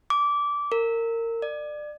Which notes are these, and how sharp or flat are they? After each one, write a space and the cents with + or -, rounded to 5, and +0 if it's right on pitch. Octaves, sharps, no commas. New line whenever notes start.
D6 -15
A#4 -25
D5 +25